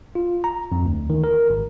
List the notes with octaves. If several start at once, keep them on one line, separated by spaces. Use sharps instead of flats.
F4
A#5
F2
D2
D#3
A#4
G#1